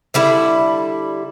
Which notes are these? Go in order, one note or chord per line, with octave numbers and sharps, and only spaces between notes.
D3 G3 E4